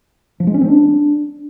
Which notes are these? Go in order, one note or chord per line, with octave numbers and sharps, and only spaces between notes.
F3
G#3
C#4
C4
D4